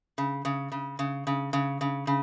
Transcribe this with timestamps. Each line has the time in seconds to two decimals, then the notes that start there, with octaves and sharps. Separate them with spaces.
0.18 C#3
0.45 C#3
0.72 C#3
0.99 C#3
1.27 C#3
1.53 C#3
1.81 C#3
2.07 C#3